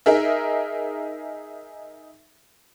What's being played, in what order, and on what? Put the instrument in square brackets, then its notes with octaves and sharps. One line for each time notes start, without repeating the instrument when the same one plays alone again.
[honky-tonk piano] D#4 G#4 A#4 E5